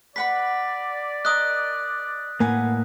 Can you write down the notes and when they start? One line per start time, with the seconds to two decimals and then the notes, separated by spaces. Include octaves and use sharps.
0.16 B4 D5 F#5 B5 B6
1.25 A#4 D#5 D#6 F#6
2.40 A2 A#3 B4 F#5 G#5